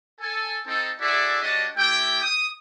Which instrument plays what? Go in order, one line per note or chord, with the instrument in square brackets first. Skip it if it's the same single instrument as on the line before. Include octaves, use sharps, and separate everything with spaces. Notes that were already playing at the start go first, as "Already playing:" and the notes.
[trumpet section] A4 G#5
C4 D#4 A4
E4 F#4 G#4 A4 D5 E5
G3 D4 F#4 C#5 D#5 A5
A3 E4 G4 G5
D#6